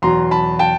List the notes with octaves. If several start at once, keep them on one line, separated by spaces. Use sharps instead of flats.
E2 B2 F#3 A#5 C6
A5 B5
G5 A5